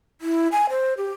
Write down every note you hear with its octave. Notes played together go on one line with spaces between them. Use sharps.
E4
G#5
C5
G4